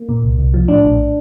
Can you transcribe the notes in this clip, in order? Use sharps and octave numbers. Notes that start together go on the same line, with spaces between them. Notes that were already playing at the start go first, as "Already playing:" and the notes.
Already playing: A#3
A#2
C2
C2
F3
A2 D4
A#1